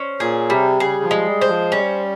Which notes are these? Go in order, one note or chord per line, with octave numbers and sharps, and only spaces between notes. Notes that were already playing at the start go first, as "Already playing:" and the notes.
Already playing: C#4 C5
A#2 G#4
C3 G3
C#3 G#4
F3
G#3
G3
C5
F3
G3 C#4